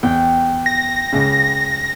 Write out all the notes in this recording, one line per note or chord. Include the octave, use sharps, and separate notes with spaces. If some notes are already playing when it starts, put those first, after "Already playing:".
E2 G5
A#6
C#2 C#3